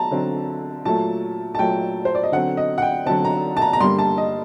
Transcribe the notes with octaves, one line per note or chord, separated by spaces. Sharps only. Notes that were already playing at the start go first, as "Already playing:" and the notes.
Already playing: F#3 A5 A#5
D3 F#3 C4
A#2 F#3 A3 A5
A5
A#2 F#3 A3 G5
C5
D5
D#5
D3 F#3 C4 F#5
D#5
F#5
G5
D3 F#3 C4 A5
A#5
A5
A#5
A#5
G2 D3 G3 A#3 C6
A5
D#5